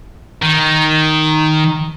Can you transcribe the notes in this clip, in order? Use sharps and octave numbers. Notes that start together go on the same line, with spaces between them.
D#3